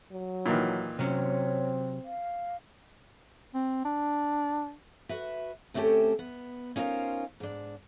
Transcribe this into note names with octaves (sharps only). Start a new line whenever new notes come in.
F#3
A#2 D#3 E3
C3 F#3 C4 C#4 C#5
F5
C4
D4
F#4 B4 E5
D2 A3 C4 C#4 G4 A4
B3
C#4 D#4 F4 G#4 A#4 C5
G#2 D4